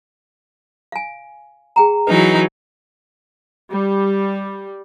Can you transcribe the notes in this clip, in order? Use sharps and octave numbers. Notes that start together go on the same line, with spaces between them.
F5 G#5
G#4 G5 A#5
E3 F#3 D#4 B4
G3